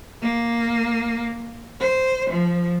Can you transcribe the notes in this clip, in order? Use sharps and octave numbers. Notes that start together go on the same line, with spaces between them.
A#3
C5
F3